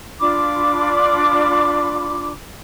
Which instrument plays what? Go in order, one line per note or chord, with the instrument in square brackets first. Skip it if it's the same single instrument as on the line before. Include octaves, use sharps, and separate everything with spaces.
[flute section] D4 F4 B5 D6